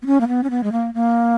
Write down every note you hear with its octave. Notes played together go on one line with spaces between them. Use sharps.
B3
C#4
A#3
B3
C#4
B3
G#3
A#3
A#3